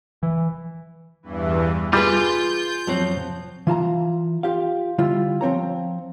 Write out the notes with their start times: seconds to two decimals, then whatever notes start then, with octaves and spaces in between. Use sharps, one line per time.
0.23 E3
1.23 E2 G2 E3
1.93 G3 F4 G#4 B4 C6 G6
2.87 F2 F#3 C4
3.67 E3 F4 A5 A#5
4.43 F4 G4 F5
4.98 D3 G3 E4 F4
5.41 F3 C4 C#5 A#5